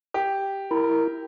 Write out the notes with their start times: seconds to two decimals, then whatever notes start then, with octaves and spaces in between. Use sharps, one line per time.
0.14 G4
0.71 E4 A#4